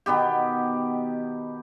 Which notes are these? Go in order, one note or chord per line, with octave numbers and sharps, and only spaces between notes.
B2 D#3 B3 G4